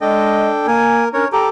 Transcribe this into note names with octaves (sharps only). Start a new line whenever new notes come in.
G#3 D4 A4 D#5 G5
A#3 A#4 G#5
C#4 D4 A#4 C#5
G4 A4 G5 A#5